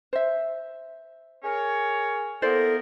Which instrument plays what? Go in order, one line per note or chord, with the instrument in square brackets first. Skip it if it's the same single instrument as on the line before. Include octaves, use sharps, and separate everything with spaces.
[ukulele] C5 E5
[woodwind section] G#4 A#4 C#5
[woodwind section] A#3 B3 A#4 [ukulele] E4 C5 D5 [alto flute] A4